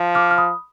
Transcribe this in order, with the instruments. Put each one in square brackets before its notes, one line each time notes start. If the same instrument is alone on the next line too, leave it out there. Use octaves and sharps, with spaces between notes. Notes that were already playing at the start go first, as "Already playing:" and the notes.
Already playing: [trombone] F3
[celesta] D6 F6
F6
B5 D#6